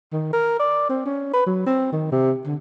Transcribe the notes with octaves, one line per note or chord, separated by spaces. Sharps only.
D#3
A#4
D5
C4
C#4
B4
F#3
C4
D#3
C3
D3